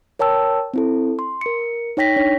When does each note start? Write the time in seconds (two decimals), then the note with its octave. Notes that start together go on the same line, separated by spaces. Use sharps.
0.19 A#4 C#5 G5 A5 E6
0.74 C4 E4 A4
1.19 C6
1.41 A#4 C#7
1.97 D#4 C#5 G5 A#6 B6
2.16 D4 C#5